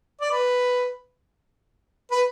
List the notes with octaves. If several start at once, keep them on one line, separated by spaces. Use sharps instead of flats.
D5
B4
B4